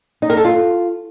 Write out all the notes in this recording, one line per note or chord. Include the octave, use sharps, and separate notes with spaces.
D#4
A#4
A4
F4